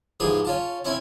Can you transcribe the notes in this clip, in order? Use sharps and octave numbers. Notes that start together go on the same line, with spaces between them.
G#2 E3 F3 G4 G#4
C#4 F4 A5
C4 C#4 E4 G#5